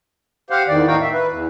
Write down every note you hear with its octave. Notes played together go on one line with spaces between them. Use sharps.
G4 C5 F5 F#5
E2 D#3 D5
A2 D#3 D#4 F#4 F5 G5
E5
B4
E2